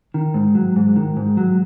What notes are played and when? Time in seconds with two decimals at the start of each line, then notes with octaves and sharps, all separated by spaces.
0.14 D#3
0.34 G#2
0.55 F#3
0.76 G#2
0.96 D#3
1.17 G#2
1.37 F#3